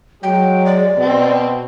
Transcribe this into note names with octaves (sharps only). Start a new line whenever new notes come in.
F#3 G#3 G5
D5
B2 C4